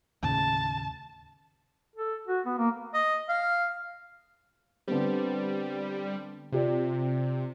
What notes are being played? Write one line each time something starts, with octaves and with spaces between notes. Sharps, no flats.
D#2 A2 C#3 A5
A4
F#4
B3
A#3
D#5
F5
D3 G3 B3 C4
C3 F4 G4 D5